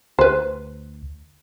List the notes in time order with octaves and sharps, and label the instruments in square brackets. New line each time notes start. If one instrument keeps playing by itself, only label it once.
[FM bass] D2 [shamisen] B4 C5